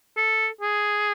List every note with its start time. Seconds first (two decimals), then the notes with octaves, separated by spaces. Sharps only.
0.17 A4
0.61 G#4